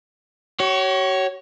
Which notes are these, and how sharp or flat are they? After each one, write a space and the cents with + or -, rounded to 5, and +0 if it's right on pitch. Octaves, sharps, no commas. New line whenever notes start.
F#4 +45 C#5 +0